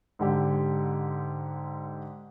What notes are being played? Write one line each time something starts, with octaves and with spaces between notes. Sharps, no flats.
G#2 D3 G4